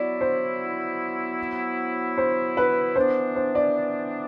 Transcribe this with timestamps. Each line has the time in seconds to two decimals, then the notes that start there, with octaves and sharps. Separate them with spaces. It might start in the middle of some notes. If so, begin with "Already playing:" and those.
Already playing: F#3 B3 E4 D5
0.21 C5
2.18 C5
2.57 B4
2.96 E3 B3 D4 C5
3.36 C5
3.55 D5